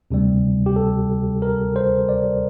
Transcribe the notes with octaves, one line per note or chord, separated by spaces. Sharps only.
D2 C3 G3
G4
A4
A#4
C5
D5